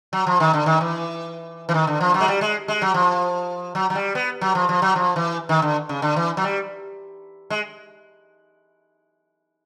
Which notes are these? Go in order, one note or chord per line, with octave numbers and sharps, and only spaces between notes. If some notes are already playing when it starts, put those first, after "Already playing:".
F#3
F3
D#3
D3
D#3
E3
E3
D#3
D3
F3
F#3
G#3
G3
G#3
G#3
F#3
F3
F#3
F#3
G3
B3
F#3
F3
F3
F#3
F3
E3
D#3
D3
C#3
D3
E3
F#3
G3
G#3